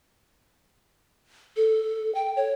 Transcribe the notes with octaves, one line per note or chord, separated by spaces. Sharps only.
A4
G5
C#5